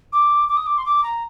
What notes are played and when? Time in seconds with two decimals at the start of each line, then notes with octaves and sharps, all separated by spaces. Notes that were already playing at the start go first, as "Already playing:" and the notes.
0.13 D6
0.49 D6
0.57 D#6
0.66 D6
0.78 C6
0.86 D6
1.03 A#5